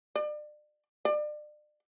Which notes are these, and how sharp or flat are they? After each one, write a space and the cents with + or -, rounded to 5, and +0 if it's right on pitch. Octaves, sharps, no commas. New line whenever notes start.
D5 +35
D5 +35